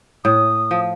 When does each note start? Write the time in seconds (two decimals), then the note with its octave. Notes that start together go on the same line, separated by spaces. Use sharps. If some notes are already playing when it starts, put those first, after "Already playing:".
0.24 A2 D#6
0.71 F3